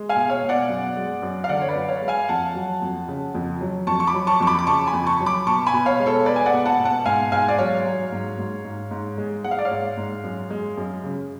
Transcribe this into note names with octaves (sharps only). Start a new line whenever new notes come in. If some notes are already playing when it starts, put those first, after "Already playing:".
Already playing: G#3
F5 G#5
B2
C#5 F5
B2
D5 F#5
F#2
G#3
F#2
F5
D3 D5 F#5
C#5
B4 D5
F#2
C#5 F5
G#3
F5 G#5
F2 F#5 A5
F#3
F2
C#3
F2
F#3
F2 A5 C#6
C#6
B5 D6
F#3
A5 C#6
F2 C#6
B5 D6
D6
C#3 A5 C#6
G#5 B5
F2
A5 C#6
F#3
B5 D6
B2 A5 C#6
G#5 B5
B2
C#5 F5
G#3
A4 C#5
G#3 B4 D5
G#5
D5 F#5
B2
F#5 A5
B2
F#5 A5
G#2 F5 G#5
G#2 F5 G#5
D5
F#3 C#5 F5
F#3
G#2
G#2
G#2
G#2
G#3
G#3 F#5
F5
D5
C#5 F5
G#2
G#2
F#2
G#3
F#2
C#3